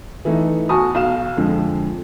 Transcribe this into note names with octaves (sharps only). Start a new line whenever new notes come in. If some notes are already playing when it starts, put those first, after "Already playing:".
E3 A3 D#4
B1 F#4 G#5 A5 C#6 D#6
B1 F5 E7
F2 D3 F3 G#3